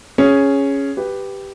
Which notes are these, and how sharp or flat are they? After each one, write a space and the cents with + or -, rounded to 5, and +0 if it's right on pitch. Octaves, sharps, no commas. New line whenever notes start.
C#4 +0 G#4 +0
G4 +0 B4 +0